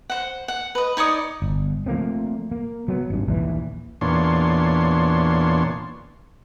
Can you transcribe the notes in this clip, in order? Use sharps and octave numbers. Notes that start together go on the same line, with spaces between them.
C5 F#5
F#5
B4 D#5
D#4 C#5 D5 D#6
G1
F3 A3 A#3 C4
A#3
F#3 B3
G#1 G2
A#1 D#2 E3
E2 A#2 D4 C#5 C6